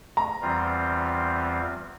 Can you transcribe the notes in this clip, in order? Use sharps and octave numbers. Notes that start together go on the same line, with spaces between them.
A#5
E2 E3 G3 C4 F4